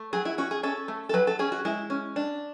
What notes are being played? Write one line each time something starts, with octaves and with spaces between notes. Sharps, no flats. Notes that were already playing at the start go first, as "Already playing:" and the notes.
Already playing: A3
F#3 G#4
E4
C#4 F#4
G#4
C#4 A4
A3
A4
F#3 B4
A4
C#4 G#4
F#4
G#3 E4
C#4
D4